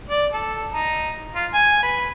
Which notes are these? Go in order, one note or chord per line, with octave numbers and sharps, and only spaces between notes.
D5
A4
D#4
F4
G#5
B4